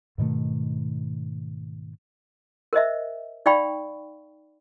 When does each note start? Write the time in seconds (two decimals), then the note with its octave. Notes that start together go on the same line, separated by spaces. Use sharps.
0.18 G#2 B2 D#3 A3
2.73 A#4 C5 D#5 E5
3.46 D#4 D5 F5 G5 B5 C#6